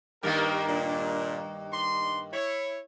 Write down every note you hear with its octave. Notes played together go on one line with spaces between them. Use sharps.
G2 D#3 G3 A#3 G4 A#4
A#2 D4
D#4 D5 C6
E4 C#5